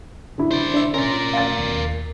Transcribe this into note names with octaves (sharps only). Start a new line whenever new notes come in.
D3 E4
C5 D5
D4 E5
C#4 A#4 D5 C6 A#6
F5 A6
D#2